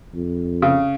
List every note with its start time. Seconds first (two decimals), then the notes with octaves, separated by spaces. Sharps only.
0.14 F2
0.62 C#3